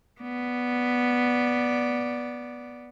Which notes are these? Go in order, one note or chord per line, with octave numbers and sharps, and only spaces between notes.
B3 D5